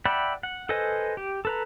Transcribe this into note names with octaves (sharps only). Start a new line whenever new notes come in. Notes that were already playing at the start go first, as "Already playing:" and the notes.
D5 E5 F#5 G5 B5
F#5
A4 B4 C5 D#5 G#5
G4
A4 B4 A#5